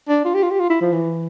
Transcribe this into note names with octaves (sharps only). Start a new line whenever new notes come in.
D4
F4
G4
F4
G4
F4
E4
F3
E3